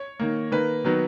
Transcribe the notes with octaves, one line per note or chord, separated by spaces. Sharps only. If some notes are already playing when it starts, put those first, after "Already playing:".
Already playing: C#5
D#3 A#3
D#3 A#3 B4
D#3 F#3 B3